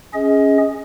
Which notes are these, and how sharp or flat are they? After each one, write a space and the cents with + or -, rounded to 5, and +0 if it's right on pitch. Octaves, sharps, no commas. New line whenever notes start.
C#4 +0 G#4 +0 D#5 +25